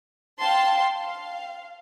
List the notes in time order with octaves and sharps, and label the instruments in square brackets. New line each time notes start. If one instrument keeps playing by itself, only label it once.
[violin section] F5 G5 A5 C6
F5